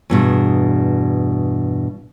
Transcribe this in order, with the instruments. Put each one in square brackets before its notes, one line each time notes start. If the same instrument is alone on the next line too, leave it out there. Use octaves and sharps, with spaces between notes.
[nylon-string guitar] E2 G2 B2